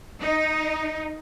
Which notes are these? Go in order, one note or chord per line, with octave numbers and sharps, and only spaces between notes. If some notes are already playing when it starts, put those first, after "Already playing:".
D#4